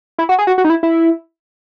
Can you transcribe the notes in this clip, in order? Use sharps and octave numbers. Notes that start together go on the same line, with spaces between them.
E4
F#4
G#4
F#4
F#4
D#4
E4
E4